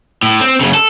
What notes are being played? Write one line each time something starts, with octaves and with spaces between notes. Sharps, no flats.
A2
C4
F#2 C#3
A4